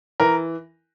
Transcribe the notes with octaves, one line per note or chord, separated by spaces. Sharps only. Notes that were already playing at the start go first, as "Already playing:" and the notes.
E3 A#4